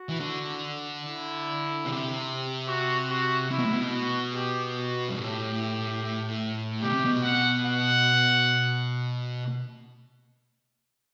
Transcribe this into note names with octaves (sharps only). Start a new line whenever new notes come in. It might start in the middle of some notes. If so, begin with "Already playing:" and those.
Already playing: F#4
E3
D3
E4
C3
F#4
F#4
C3 E4
B2
A2
B2
F#4
G4
F#4
G2
A2 G4
B2 G4
C3
B2
F#5
F#5